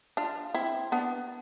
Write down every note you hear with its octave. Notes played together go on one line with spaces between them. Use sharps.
D4 F4
C4 E4
B3 D4